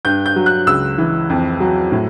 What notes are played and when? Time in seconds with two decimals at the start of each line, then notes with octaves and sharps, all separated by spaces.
0.05 G2 G6
0.26 G6
0.36 F#3
0.46 F#6
0.67 C#2 E6
0.98 E3
1.30 F2
1.60 F#3
1.92 A2